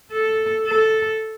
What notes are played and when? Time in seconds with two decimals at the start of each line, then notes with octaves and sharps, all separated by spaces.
0.12 A4
0.67 A4